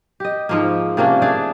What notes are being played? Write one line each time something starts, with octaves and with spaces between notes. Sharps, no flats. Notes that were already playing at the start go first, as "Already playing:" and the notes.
G4 D#5
G#2 F3 A#3
C3 A#3 C#4 D4
A3 D4 G#4 D5